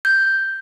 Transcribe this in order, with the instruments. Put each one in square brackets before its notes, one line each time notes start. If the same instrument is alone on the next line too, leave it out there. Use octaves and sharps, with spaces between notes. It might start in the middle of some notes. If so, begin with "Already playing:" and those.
[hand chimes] G6